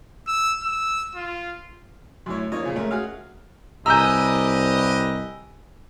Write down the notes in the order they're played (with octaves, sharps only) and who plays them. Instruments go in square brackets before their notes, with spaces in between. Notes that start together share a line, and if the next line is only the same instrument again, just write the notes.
[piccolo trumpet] E6
E6
F4
[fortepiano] F#2 A2 C#5
F3 A#3 D#4 C#5
A#2 C#3 F3
G#3 A3 C#4 A#4
F#4 G#4 F5
[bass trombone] C2 [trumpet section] G4 B4 D#5 [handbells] G#5 E6 [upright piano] A#5 G6